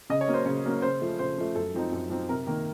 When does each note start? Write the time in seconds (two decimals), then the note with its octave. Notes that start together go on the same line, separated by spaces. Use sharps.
0.10 C#3 D#5
0.21 C#5
0.28 F#3 A#3 C#4
0.34 C5
0.45 C#3 C#5
0.65 F#3 A#3 C#4
0.82 C#3 C5
1.02 F3 A3
1.19 C#3 C5
1.38 F3 A3
1.55 F#2 A4
1.75 F3 C4 D#4
1.93 F#2
2.10 F3 C4 D#4
2.29 C3 A#4
2.47 D#3 A#3 D#4